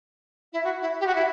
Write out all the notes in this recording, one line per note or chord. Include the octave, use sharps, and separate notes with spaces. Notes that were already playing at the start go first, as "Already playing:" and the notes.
E4
F#4
E4
G4
F#4
E4